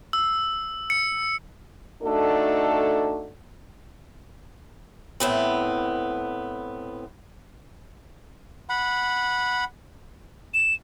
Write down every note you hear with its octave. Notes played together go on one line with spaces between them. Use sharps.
E6
C#7
A3 D4 D#4 F#4 A4
A2 B3 C4
F#5 B5
E7